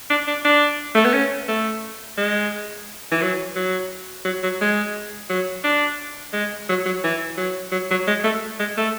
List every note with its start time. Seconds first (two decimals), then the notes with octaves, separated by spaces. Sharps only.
0.10 D4
0.27 D4
0.45 D4
0.95 A3
1.05 B3
1.14 C#4
1.48 A3
2.18 G#3
3.12 E3
3.22 F#3
3.56 F#3
4.25 F#3
4.43 F#3
4.61 G#3
5.30 F#3
5.64 D4
6.33 G#3
6.69 F#3
6.86 F#3
7.04 E3
7.37 F#3
7.72 F#3
7.91 F#3
8.08 G#3
8.24 A3
8.60 G#3
8.77 A3